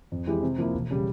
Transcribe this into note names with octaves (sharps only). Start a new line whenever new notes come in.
F2
E3 G#3 E4 G4
C3
F3 A#3 E4
E1
C#3 G3